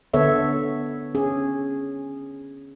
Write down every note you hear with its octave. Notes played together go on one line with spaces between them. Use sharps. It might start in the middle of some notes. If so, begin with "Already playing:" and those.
D3 B3 A4 C#5 E5
C#4 G#4